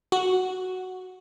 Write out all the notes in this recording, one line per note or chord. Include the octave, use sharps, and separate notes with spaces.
F#4